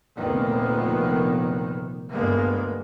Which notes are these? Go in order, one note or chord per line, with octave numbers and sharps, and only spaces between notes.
F1 D2 A#2 D#3 A#3 B3
D2 G2 G#3 A#3 B3